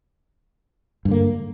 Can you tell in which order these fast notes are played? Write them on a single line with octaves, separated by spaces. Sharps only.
G2 D3 A#3